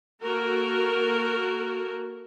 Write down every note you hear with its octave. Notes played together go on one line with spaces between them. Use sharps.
A#3 F#4 A4 A#4